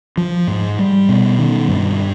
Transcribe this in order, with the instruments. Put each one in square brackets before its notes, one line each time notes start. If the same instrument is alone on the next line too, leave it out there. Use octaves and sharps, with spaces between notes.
[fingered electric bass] F3
G#2
G3
B2
D#3
G2